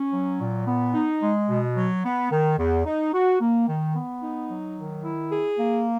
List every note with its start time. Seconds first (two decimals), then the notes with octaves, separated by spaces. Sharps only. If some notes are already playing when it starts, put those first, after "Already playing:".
Already playing: C#4
0.13 F#3
0.40 A#2
0.67 B3
0.94 D#4
1.22 G#3
1.48 B2
1.76 F#3
2.04 B3
2.31 D#3
2.58 E2
2.85 D#4
3.13 F#4
3.40 A#3
3.68 D#3
3.95 B3
4.22 D#4
4.49 F#3
4.77 D#3
5.04 E4
5.32 G#4
5.58 A#3